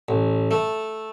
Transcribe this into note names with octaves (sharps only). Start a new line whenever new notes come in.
A1
A3